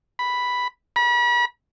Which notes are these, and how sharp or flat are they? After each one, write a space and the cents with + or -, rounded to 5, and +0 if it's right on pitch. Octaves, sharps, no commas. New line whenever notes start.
B5 +0
B5 -40